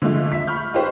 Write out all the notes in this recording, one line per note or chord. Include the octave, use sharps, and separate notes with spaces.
D3 F3 G#3 A3
E5 B6
B5 C#6 F6 G6
D#4 F4 G4 B4 C5